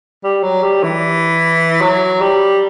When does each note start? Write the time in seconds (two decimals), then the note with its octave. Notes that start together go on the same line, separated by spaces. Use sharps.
0.24 G3
0.43 F#3
0.63 G3
0.83 E3
1.81 F#3
2.21 G3